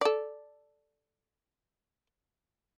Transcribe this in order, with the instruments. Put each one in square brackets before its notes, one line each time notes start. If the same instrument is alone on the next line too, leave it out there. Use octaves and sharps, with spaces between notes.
[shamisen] A4 D5